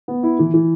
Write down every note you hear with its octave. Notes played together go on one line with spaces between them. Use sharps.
B3
E4
E3
E3